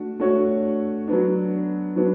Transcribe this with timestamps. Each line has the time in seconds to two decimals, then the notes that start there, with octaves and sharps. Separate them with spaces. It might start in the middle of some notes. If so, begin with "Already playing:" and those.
Already playing: A3 D4 F#4
0.20 A3 D4 F#4 C#5
1.08 F#3 B3 D4
1.96 F#3 B3 D4